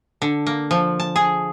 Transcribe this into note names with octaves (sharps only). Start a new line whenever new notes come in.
D3
A#3
F3
A5
G#4